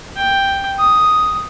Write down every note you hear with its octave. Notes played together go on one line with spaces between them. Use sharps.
G5
D#6